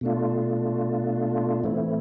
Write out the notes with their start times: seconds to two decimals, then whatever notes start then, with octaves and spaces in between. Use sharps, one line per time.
0.01 B2 A3 D4 F4
1.64 A2 E3 A3 C4 E4